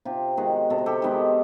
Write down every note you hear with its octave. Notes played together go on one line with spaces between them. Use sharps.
C3 F4 G4
D#3 G#3 B3 F#4 G#4
C3 A4
A#4
G4 A4
D#3 G#3 B3